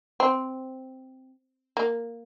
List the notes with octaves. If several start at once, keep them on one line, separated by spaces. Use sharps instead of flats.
C4
A#3